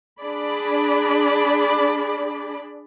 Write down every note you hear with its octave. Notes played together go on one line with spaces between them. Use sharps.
D4 G#4 D5 B5